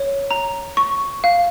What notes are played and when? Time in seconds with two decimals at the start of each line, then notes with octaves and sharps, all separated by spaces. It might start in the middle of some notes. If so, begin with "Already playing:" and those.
Already playing: C#5
0.31 A#5
0.77 C#6
1.24 F5